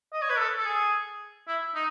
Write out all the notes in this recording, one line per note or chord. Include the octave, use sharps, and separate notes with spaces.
D#5
C#5
B4
A4
A4
G#4
E4
D#4